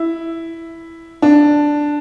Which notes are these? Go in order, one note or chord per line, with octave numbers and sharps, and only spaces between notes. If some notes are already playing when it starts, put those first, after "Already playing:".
Already playing: E4
D4